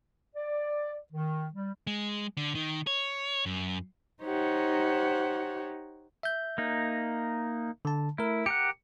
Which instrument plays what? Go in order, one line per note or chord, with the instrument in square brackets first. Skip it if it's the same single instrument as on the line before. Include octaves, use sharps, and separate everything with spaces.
[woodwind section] D5
D#3
G3
[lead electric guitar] G#3
D3
D#3
C#5
F#2
[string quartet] D#4 G4 C5 C#5 F#5
[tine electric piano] E5 G6
[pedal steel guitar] A#3 D#4
[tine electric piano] D3 A5
[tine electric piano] A3 A#4 [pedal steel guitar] E4
[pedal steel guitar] G4 A#4 F#5 [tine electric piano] C#7